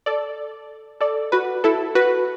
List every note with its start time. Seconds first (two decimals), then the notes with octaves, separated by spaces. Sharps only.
0.06 A4 D5
1.01 A4 D5
1.32 F#4 B4
1.64 E4 A4
1.95 F#4 B4